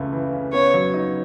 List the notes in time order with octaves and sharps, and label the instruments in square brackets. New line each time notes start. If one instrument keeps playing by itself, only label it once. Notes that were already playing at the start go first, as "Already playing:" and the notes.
Already playing: [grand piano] C#2 C#3 E3 A3
E3
C#3
[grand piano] B3 [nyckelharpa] C#5
[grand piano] F#3
D#4